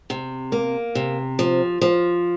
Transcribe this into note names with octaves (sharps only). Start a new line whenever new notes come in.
C3
A#3
C3
F3
F3